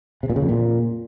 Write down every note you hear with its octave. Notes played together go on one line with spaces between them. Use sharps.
C3
A#2
C#3
F2
A#2